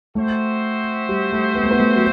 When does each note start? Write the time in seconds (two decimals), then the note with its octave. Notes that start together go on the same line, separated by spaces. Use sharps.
0.15 A3 C4 F#4 C5 E5
1.09 G3
1.32 A3
1.55 B3
1.63 A3
1.71 B3
1.80 A3
1.96 F#3